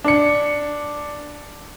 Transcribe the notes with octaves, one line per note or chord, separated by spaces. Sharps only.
D4 C#7